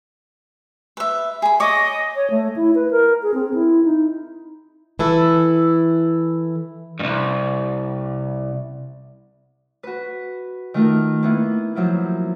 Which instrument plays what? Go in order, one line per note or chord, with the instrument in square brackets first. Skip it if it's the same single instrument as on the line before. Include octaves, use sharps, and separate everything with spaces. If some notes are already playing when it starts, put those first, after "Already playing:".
[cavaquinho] B4 E5
G#4 B5
[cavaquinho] C#5 D6 [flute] D#5
[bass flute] C#5
A3
E4
B4
A#4
G#4
C4
E4
D#4
[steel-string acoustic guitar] E3 E4 A4
[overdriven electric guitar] C2 G2
[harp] F#4 B4
D#3 A3 F4 A#4
A#3 B3 E4
F3 F#3 E4 F4